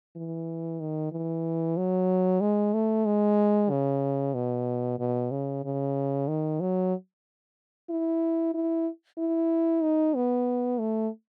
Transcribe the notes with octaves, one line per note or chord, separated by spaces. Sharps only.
E3
D#3
E3
F#3
G#3
A3
G#3
C#3
B2
B2
C#3
C#3
D#3
F#3
E4
E4
E4
D#4
B3
A3